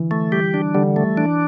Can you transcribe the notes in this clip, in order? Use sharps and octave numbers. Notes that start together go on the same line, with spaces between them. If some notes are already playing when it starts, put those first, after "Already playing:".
Already playing: D3 E3
A3
G3 G4
D4
D3 G3
A3
E3 D4